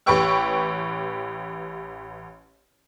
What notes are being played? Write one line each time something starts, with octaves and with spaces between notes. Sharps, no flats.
A1 G4 B4 G5 C#6 E6